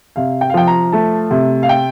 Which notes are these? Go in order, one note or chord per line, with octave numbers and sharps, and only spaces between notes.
C3 F5
G5
F5
F3 G5
A#5
A3 A5
C3
F5
G5